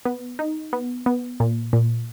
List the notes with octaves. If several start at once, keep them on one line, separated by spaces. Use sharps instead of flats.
B3
D#4
B3
B3
A#2
A#2